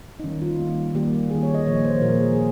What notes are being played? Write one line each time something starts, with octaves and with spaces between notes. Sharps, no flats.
D#4
D#3 G3 A#3 C#4
F4
D#3 G3 A#3
D#3 G3 A#3 G4
D#3 G3 A#3 G#4
C#5
D#5
A#2 F3 A#3 C#5
C5
A#2 F3 A#3 A#4
G#4
G#4